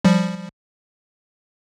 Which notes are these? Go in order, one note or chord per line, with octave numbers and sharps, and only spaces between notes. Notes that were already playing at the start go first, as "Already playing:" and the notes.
F3 G3